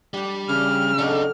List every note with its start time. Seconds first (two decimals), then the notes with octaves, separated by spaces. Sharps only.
0.14 G3 D4 G4
0.49 C#3 E3 D4 E4 F6
0.98 F#3 A3 D4 D#4 G4